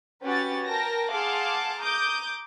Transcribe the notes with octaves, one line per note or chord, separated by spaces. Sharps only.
C#4 F#4 G4 B4 A6
A#4 G5 A5 A#6
G#4 F5 F#5 A5 C6 D6
A#5 D6 D#6 G6